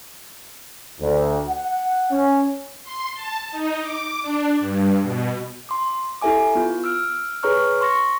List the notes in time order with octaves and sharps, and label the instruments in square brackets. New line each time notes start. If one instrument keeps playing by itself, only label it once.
[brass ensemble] D2
F#5
C#4
[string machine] C6
A5
D#4
D6
D4
G2
B2
[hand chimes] C6 D6
E4 G4 A4 E5 G#5 D6
B3 F4
E6 F6 D7
G#4 B4 C#5 A#5 C#6 F6
C6 C#6 A#6 C#7